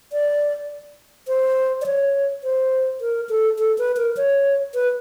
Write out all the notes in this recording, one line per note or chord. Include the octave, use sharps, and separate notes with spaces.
D5
C5
D5
C#5
C5
A#4
A4
A4
B4
A#4
C#5
B4